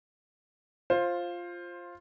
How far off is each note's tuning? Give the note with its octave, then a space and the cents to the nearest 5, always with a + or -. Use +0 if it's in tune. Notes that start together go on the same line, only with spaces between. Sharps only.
F4 +0 C5 +15